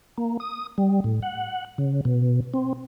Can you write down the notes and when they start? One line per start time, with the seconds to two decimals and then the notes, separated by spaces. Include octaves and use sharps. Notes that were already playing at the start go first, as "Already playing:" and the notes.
0.18 A#3
0.40 D#6
0.78 G3
1.04 A2
1.22 F#5
1.78 C#3
2.05 B2
2.54 C4